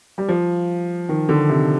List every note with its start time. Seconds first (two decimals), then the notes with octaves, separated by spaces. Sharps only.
0.18 G3
0.28 F3
1.09 D#3
1.29 D3
1.49 C3